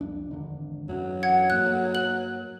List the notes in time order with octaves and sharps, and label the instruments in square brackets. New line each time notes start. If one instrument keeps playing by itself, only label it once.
[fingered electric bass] C2 F2 D4
G#1 E2 D3
[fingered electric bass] F#2 E3 [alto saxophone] F#3
[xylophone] F#5 G#6
[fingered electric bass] G2 A#3 [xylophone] F#6
[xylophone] F#6 F#7